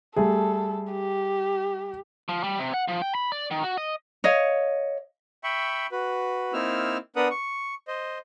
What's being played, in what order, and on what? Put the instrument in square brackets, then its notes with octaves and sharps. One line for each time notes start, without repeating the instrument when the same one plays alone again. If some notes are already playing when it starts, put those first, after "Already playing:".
[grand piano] G3 A3 G#4 [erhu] A4
[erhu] G4
[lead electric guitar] F3
G3
C3
F#5
F3
G5
B5
D5
D#3
F#4
D#5
[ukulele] C#5 D#5 F5
[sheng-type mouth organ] E5 G5 B5 C#6
F#4 B4
A#3 C4 D#4 E4 E6 F6
B3 D4 A#4 B4 F#5 D#6
C#6
C5 D#5